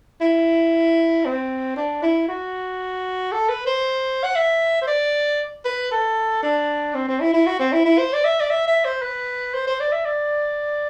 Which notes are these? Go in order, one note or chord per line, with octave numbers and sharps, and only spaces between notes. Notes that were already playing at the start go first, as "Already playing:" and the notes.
E4
C4
D4
E4
F#4
A4
B4
C5
F#5
E5
C5
D5
B4
A4
D4
C4
C4
E4
E4
F#4
C4
E4
E4
C5
D5
E5
D5
E5
E5
C5
B4
C5
C5
D5
E5
D5